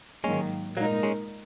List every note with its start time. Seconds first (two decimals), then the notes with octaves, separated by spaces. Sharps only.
0.24 G#2 D#3 F#3 G#3 A#3 C#4
0.77 A#2 F#3 G#3 A#3 D#4 A#4
1.03 G#3 C#4